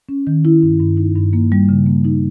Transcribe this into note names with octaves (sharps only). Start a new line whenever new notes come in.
C#4
D#3
E4
G2
G2
D#4
G2
A#3
G3
C#3
A#3
D#4